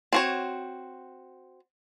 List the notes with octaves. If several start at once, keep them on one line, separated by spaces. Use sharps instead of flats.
C4 F#4 C#5